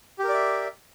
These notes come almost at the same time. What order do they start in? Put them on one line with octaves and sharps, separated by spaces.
G4 A#4 D5 E5